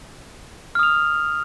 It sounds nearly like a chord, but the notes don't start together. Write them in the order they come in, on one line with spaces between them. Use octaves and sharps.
F6 D#6 F7